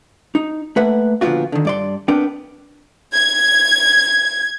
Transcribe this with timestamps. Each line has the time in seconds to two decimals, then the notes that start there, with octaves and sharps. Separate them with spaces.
0.35 D#4
0.76 A3 A#3 B4 E5 F#5
1.21 A#2 D3 F3 B3 F4 F#4
1.52 D3 D#3
1.65 G2 D5 C6
2.08 B3 C4 D4 A#4 G5
3.13 G#6